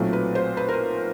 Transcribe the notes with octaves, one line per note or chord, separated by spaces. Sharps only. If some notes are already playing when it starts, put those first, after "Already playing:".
Already playing: B1 A#2 F#3 A3 C4
B4
C5
B4
A#4
B4